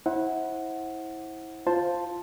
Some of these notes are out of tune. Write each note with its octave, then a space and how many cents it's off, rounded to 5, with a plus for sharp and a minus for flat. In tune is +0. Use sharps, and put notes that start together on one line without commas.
E4 -25 C5 +25 F#5 +0
F4 +0 C5 +0 A5 +0